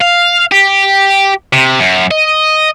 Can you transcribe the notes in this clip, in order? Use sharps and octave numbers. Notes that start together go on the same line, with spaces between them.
F5
G4
C3
F#2
D#5